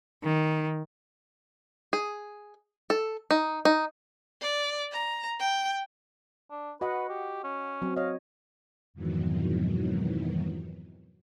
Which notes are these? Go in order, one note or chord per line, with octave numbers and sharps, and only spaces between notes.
D#3
G#4
A4
D#4
D#4
D5
A#5
G5
D4
F#4 B4 D#5 F#5
G4
C#4
F#3 C4
C#5 D#5 F5
F2 G#2 B2 D#3 E3 F#3